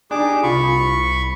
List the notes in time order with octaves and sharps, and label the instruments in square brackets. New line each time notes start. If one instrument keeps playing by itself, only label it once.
[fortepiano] D4 [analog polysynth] D#4 G4 [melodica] G#4 D6
[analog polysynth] C2 [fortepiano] F4 [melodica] B5 [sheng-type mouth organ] C#6